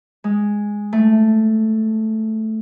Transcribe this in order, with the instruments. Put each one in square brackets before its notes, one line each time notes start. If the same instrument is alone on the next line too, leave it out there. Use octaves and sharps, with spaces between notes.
[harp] G#3
A3